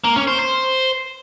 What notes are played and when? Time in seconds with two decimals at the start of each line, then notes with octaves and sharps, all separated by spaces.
0.04 A#3
0.16 C#4
0.27 C5
0.39 C5